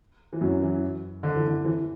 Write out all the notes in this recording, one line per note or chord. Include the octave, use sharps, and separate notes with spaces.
E3
F#2 F#3
E3
D3
E3
D3
E3